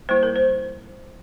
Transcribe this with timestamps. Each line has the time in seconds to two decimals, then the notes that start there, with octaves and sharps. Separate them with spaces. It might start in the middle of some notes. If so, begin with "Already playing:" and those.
0.09 G3 A#3 E4 C5
0.23 A#4
0.36 C5